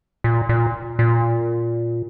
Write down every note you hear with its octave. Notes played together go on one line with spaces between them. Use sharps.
A#2
A#2
A#2